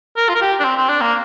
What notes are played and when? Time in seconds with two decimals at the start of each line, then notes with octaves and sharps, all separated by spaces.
0.17 A#4
0.29 F4
0.35 A#4
0.41 G4
0.60 D4
0.64 C4
0.77 C4
0.89 D4
1.01 A#3